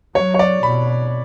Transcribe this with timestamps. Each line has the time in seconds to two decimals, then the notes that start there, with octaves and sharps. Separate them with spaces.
0.15 F#3 C#5
0.34 C#5
0.39 D5
0.63 B2 B5